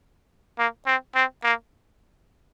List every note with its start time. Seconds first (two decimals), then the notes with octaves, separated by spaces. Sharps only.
0.58 A#3
0.87 C4
1.15 C4
1.44 A#3